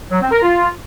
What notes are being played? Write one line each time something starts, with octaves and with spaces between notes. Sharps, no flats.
F#3
C4
A#4
F4